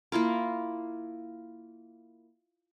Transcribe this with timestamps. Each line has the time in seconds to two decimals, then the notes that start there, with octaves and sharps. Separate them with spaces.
0.12 A#3 E4 F4 A#4